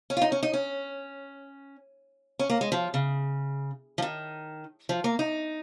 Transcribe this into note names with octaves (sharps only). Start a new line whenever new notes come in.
C#4
F4
D#4
C#4
D#4
C#4
C#4
A#3
G#3
F3
C#3
F3
D#3
F3
A#3
D#4